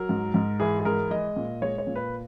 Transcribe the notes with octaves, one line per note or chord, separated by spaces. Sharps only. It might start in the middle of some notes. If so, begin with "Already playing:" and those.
Already playing: F#3 A#4
G#2
G#2
E3 G#4
G#4
G#3 A#4
G#3 D#5
A#2
G#3 C#5
C#5
A#2
B4